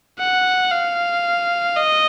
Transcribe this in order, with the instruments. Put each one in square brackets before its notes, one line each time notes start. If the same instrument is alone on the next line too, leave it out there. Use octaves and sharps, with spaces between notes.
[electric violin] F#5
F5
D#5